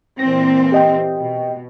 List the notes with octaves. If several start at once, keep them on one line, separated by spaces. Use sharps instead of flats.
A#2 E3 C4 A#6
G4 D#5 G5
B2